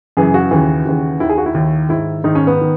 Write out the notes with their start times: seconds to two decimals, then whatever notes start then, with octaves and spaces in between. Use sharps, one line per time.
0.17 F#2 C#3 E3 G#4
0.34 F#4
0.51 D#2 C#3 E3
0.85 D#2 C#3 E3
1.20 D#2 D#3 E4
1.29 G#4
1.38 F#4
1.46 E4
1.54 D#2 D#3
1.89 G#2 D#3 E4
2.24 G#2 D#3 D#4
2.35 C#4
2.47 B3
2.61 D#3